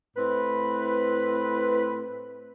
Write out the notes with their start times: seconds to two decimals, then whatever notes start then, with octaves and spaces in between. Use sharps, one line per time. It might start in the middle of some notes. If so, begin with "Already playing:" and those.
0.17 A2 C4 B4